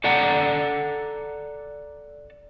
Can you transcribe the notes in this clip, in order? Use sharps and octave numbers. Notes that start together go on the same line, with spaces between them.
A4 D5 F#5 A5 A#5